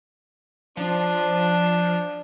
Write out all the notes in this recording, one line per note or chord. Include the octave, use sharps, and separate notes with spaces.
F3 D4